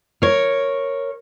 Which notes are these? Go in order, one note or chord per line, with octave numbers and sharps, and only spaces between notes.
A#4 C#5